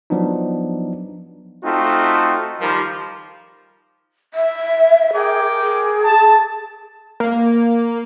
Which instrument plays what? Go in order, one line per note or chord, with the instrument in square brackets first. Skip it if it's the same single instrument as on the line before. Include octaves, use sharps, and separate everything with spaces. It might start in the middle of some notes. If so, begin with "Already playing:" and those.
[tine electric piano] F3 F#3 B3 D4 D#4
[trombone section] A3 C4 D#4 F4 F#4
D#3 F3 G3 A#4
[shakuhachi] E5
[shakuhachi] G#4 [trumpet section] A#4 G5 D6
[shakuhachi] G#4
[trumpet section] A5
[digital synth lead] A#3